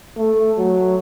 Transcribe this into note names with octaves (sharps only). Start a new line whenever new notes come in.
A3
F#3